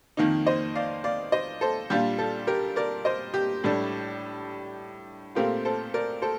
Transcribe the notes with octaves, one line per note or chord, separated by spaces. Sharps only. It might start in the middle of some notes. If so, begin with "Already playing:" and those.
F2 D#3 A#3 D#4
C5 D#5
D5 F5
D5 F5
C5 D#5
A4 C5
A#2 G3 D4 F4 G4
A4
G4 A#4
A#4 D5
C5 D#5
G4
A2 G3 D4
A#2 A3 C4 F4 G4 A#4
A4 C5
A#4 D5
A4 C5